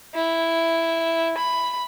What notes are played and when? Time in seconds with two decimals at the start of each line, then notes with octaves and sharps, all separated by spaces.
0.15 E4
1.38 B5